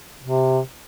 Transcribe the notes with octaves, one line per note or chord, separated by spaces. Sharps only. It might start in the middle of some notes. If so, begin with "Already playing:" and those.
C3